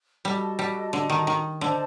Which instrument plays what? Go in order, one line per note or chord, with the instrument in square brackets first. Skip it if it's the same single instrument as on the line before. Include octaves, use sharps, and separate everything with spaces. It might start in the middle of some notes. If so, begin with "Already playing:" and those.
[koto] G3 [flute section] F#4 A4 D#5 A5
[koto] G3
D3
D#3
D#3
[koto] D3 [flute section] A4 C5 D#5 A5